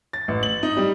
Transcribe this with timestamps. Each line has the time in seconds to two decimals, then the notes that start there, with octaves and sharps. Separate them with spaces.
0.13 A6
0.28 A1
0.43 F#7
0.63 D#4
0.77 G3